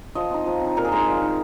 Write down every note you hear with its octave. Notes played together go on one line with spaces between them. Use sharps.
F3 D#5
C4 D#4
F3
C4 D#4
A#2 A#4
G#4
G#3 D#4 A#4
A#2
G#3 D#4